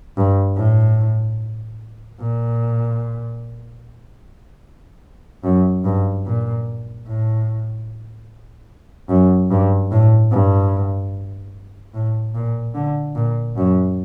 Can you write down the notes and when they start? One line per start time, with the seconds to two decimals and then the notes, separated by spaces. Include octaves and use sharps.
0.17 G2
0.57 A2
2.20 A#2
5.44 F#2
5.85 G2
6.26 A#2
7.08 A2
9.09 F#2
9.51 G2
9.92 A2
10.32 G2
11.94 A2
12.35 A#2
12.75 D3
13.15 A#2
13.57 F#2